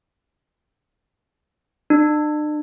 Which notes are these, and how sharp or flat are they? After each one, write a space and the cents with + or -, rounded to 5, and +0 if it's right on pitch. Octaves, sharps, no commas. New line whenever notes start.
D4 +45